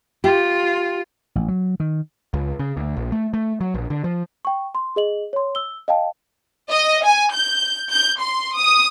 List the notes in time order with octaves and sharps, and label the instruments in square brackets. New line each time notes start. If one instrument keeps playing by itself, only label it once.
[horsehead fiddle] F4 [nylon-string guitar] G4
[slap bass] A1
F#3
D#3
[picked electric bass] C#2
C#3
D2
A#1
A3
A3
F#3
A#1
D3
F3
[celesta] G5 C#6
C6
G#4 D#5 F#7
C#5 C6
E6 G7
D#5 F5 G5 A5
[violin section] D#5
G#5
G6
G6
C6
D#6